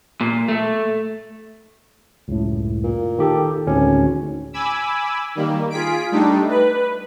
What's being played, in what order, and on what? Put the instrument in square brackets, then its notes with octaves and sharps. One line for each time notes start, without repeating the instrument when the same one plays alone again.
[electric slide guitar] A#2
A3
[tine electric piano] C#2 F#2 A2
[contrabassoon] A#2
[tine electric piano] D#3 G4 A4
[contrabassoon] G#1 [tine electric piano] D2 A2 C#4
[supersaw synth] G#5 B5 D6 E6
D#3 G3 A#3
F4 G#4 B6 D7
G3 A3 D4 D#4
B4